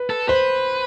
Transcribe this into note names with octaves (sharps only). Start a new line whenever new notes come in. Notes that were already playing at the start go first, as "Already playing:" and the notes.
Already playing: B4
A4
B4 C5